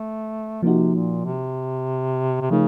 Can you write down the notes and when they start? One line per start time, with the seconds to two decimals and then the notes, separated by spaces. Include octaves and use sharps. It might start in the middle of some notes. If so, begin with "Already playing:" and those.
Already playing: A3
0.63 C3 F3 A#3 D#4 F#4
0.95 A#2
1.25 C3
2.41 C3
2.51 C#3 F3 A3 D#4 A#4